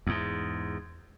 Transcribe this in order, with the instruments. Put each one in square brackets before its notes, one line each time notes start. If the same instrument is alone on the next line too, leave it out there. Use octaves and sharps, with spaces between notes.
[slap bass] E2 G#2